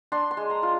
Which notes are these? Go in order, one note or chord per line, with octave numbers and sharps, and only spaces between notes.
D4 C6
C6
G#3
A#5
F4